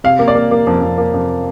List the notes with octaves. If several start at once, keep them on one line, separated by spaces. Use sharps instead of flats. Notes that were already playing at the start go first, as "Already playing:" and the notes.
C3 F5
A#3
D5
A#3
A#3
F2
F2
A#3
F2